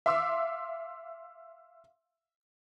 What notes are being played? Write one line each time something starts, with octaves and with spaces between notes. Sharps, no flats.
E5 F5 C6 D6 E6